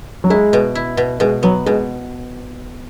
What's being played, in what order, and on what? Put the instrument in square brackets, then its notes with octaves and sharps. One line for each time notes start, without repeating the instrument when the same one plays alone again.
[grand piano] F#3
[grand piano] G#3 [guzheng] E4
[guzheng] B2
E4
B2
[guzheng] B2 [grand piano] G#3
[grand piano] F#3 [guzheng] B3
[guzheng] B2 [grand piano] G#3